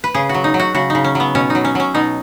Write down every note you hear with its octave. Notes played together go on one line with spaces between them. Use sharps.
B4
C#3 G#4
F#4
F#3
D#4
F#3
F#4
C#3 F#4
C#3 D#4
C#4
F#3 B3
B2 C#4
F#3 D#4
C#4
F#3 C#4
B2 D#4